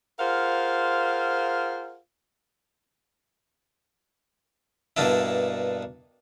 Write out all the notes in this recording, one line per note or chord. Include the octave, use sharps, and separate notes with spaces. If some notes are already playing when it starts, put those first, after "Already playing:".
F4 G#4 A#4 C5 F5 F#5
G2 B2 A#3 D4 E4